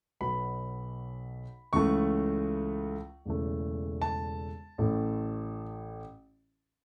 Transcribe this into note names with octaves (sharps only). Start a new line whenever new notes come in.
B1 B2 F#3 B3 B5
C#2 C#3 E3 A3 C#6
E1 E2 C#3 E3 A3
A5
A1 A2 E3 A3